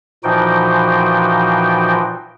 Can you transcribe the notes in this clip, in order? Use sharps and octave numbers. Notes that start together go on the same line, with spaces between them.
A#2 E3 F3 D#4 F#4 G5